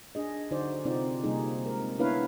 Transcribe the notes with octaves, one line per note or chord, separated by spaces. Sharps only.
D4 G#4 D#5
D3 D#4 F#4 C5 D5
C3 C4 D#4 F4 D5
C3 G3 A#3 D#4 G#4
G#3 A#4
B3 D4 E4 B4 C#5 F5